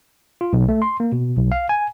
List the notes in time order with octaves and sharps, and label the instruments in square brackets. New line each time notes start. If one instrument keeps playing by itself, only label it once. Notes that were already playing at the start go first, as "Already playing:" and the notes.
[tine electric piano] F4
B1
A3
C6
A#3
B2
B1
F5
G#5